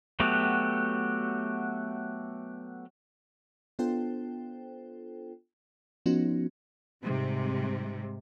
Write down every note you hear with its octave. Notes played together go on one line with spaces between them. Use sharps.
F#3 A3 B3 F#4 G4
B3 D4 F4 A4 C5 G5
F3 B3 C#4 D#4 F#4
G#2 C3 G3